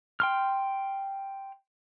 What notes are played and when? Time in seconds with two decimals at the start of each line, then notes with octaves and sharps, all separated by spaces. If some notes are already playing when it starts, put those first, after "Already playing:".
0.20 G5 C6 F6